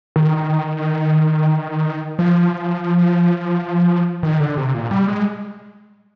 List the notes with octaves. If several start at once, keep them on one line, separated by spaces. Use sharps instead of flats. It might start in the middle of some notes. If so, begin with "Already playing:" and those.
D#3
F3
D#3
D3
C3
A#2
G3
G#3